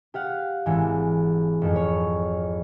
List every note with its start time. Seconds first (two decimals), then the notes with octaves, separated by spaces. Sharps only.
0.14 G4 F5 F#5
0.66 G#1 E3
1.61 G#1 F2
1.76 C#5